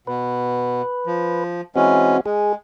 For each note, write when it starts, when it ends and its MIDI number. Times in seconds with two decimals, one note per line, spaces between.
0.07 0.82 47
0.07 1.44 71
1.06 1.61 53
1.76 2.17 52
1.76 2.17 56
1.76 2.21 60
1.76 2.17 61
1.76 2.21 66
2.26 2.55 56
2.26 2.53 68